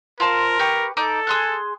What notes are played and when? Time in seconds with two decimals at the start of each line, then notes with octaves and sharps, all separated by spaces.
0.20 F4 A#4 C5 A5
0.59 G4 B4 C#6
0.97 D#4 A4 D6
1.27 G#4 C6 F#6